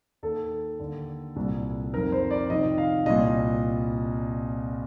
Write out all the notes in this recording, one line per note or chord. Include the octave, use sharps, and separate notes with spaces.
D#2 D#3 A4
D#2 D3
C2 A#2
F2 D#3 A#4
C5
D5
F2 C3 D#3 D#5
F5
C2 A#2 D#5